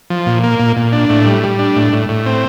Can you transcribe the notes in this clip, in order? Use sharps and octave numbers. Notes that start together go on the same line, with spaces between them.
F3
A#2
A#3
A#2
A#2
D4
A2
G3
G3
D4
A2
A2
A2
C4